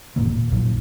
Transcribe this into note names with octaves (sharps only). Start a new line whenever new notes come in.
E1 A2 D#3 A#3
A#2
A#1 F#2 A#2 D#3